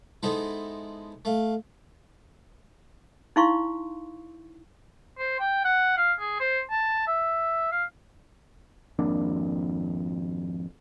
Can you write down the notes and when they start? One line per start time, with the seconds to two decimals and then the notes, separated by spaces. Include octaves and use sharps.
0.23 G#3 B3 D#4 E4 A4 C5
1.25 A3 F5
3.36 D#4 E4 F5 C6 C#6
5.19 C5
5.40 G5
5.65 F#5
5.98 F5
6.20 G#4
6.40 C5
6.71 A5
7.07 E5
7.72 F5
8.99 G#1 F2 A#3 D4